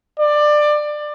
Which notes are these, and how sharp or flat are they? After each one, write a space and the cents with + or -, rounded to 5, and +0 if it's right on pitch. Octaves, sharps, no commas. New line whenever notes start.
D5 +20